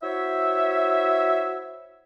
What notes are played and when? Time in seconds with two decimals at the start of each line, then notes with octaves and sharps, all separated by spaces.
0.03 E4 F#4 C5 C#5 E5